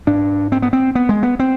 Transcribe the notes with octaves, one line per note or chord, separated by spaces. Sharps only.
G#2 D4
C4
B3
C4
B3
G#3
B3
C4